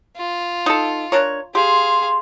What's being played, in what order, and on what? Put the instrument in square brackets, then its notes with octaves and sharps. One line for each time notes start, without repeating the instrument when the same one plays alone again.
[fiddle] F4
[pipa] D#4 A4
D4 A#4 C#5
[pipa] G4 [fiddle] G#4 F5 [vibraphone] C6